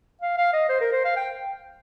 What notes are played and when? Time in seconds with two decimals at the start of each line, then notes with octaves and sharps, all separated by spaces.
0.21 F5
0.37 F5
0.53 D#5
0.69 C5
0.81 A#4
0.92 C5
1.05 F5
1.16 G5